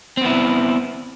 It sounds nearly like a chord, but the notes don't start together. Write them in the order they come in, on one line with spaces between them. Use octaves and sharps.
C4 B3 E4